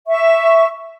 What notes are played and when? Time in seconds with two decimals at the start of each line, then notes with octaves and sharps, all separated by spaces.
0.07 E5 C#6